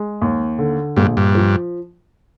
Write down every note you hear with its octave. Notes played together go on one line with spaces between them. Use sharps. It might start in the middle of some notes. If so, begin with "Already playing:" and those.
Already playing: G#3
D#2
D3
A#1 G2
G2
F3